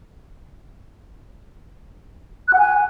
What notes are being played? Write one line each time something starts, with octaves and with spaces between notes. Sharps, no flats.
F#6
F#5
G#5